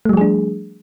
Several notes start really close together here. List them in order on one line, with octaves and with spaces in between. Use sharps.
A3 G3 F3 G#4 D4